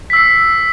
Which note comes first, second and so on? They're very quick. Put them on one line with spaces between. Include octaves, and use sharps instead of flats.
B6 E6 C7